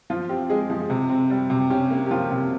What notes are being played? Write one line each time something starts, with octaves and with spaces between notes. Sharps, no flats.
F3 F4
C4 G4
G#3 G#4
F3
C3
C4
G3
C3
C#4 G4
A#3
G4
F3 F4
C3